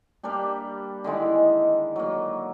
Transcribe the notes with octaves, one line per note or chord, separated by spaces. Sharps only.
G3 A#3 D4 G4
D3 D#3 G#3 E4
F#3 A#3